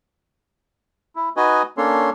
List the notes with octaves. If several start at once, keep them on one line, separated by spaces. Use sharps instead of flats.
E4
D#4 F#4 B4 D#5 G#5
A#3 C#4 D4 A4 C#5 C6